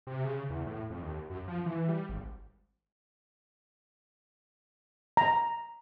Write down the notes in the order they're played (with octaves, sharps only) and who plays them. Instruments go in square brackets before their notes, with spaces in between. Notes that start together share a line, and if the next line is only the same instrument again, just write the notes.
[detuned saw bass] C3
C#3
E2
A2
F2
D#2
F#2
F3
E3
G3
G#1
[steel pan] A#5